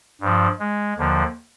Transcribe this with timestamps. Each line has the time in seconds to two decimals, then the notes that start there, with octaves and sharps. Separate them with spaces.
0.21 G2 F3
0.59 G#3
0.98 D#2 D3 F3